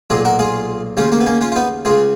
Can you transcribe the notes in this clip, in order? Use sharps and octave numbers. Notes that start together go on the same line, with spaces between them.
B1 A#2 F4 G#4
F#4 A#4
F4 G#4
D#2 C#3 C#4 F4
A#3 C#4
B3
A#3 C#4
C#4 F4
F4
B3 D#4
C#2 C#3 F4 G#4